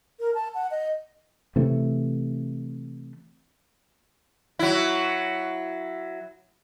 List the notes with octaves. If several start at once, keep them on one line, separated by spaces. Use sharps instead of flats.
A#4
A5
F#5
D#5
C3 E3 A3
F#3 E4